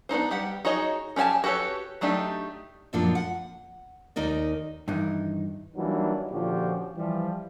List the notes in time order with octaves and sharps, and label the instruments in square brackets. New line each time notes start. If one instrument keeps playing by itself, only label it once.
[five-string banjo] B3 D4 D#4 C5
G3 G4 F#5
D#4 F#4 G#4 C#5 D#5
C#4 G4 D5 G#5 A5
F#4 G4 A4 B4 C#5
F#3 A3 D4 D#4 G4
[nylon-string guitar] F#2 A#2 F3 A#3 D4 F4
F#5
D#2 D#4 A#4 D5
[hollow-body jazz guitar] G2 D#3 E3 D#4
[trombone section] E3 F#3 G3 A#3 D4 D#4
A#2 D3 F3 C#4 F#4 G4
E3 F3 G3